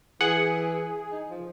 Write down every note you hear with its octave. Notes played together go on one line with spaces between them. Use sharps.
E3 G#4 F#5
D#4
F3